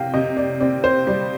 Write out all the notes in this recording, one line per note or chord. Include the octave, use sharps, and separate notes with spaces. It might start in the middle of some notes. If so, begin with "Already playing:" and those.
Already playing: C3 F5 G5
C3 D#5
D5
C4 D5
C5
G3 D5